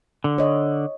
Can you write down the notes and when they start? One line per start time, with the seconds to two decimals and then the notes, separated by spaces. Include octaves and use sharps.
0.24 D3
0.38 C#5 D#5